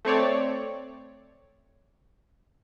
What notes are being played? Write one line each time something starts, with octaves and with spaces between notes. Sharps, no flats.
A3 C4 C#5 D5